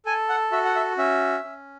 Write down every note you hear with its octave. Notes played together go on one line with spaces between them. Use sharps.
A4 G#5
F#5
F#4 E5
F#5
E5
C#4 E5
C#4